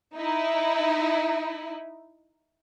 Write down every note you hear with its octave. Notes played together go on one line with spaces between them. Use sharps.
D#4 E4